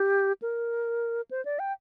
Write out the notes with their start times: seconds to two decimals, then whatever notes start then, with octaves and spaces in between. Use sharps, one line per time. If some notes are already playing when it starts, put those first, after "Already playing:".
Already playing: G4
0.42 A#4
1.31 C5
1.45 D5
1.59 G5